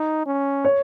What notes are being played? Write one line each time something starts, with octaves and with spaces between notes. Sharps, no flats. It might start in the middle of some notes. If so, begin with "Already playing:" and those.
Already playing: D#4
C#4
C#5